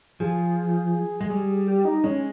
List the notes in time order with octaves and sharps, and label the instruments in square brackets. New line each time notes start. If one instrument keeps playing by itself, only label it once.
[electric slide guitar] F3 [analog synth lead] G#4
[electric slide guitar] G#3
G3
[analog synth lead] G4
D#4
[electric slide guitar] G#3 [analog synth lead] C#4